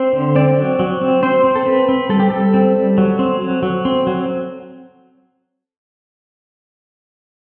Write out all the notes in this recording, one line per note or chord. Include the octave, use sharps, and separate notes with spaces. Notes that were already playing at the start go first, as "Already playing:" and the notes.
Already playing: C4 C5
D3
C4 D5
F#3
F#3
C4
C4 C5
C4
A4
C4 B4
C4
G3 A4
G4
G3 A4
C4
G3
F#3
C4
F#3
F#3
C4
F#3